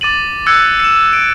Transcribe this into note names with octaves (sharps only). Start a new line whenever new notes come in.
D6 A6 D#7 F#7
D6 E6 F#6 G#6 C#7
C#7 E7
D7